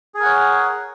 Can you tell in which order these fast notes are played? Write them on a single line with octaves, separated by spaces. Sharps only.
G#4 G#5 A#4 F#5 C#5